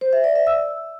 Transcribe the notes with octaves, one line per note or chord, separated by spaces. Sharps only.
C5
E5
D5
E5
E6